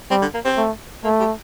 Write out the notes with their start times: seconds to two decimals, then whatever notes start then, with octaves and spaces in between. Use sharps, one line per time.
0.10 G3 C4
0.22 D3
0.34 A#3
0.45 C4
0.58 A3
1.04 A3 A#3
1.20 G3